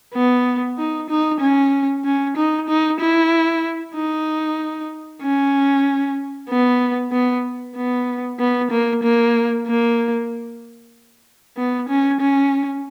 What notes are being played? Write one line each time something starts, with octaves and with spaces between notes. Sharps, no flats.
B3
D#4
D#4
C#4
C#4
D#4
D#4
E4
D#4
C#4
B3
B3
B3
B3
A#3
A#3
A#3
B3
C#4
C#4